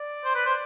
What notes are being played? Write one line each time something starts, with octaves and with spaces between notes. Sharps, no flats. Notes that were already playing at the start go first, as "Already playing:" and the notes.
Already playing: D5
C5
B4
C5